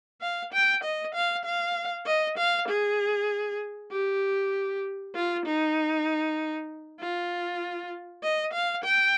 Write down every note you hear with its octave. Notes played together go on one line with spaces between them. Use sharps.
F5
G5
D#5
F5
F5
D#5
F5
G#4
G4
F4
D#4
F4
D#5
F5
G5